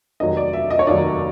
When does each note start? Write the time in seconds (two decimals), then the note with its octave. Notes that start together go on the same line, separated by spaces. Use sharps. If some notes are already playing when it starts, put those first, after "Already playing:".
0.20 F1 D#2 D#3 F#3 D#5
0.37 D5
0.53 E5
0.71 D#5
0.79 C#5
0.87 F1 D#2 D#3 F#3 D5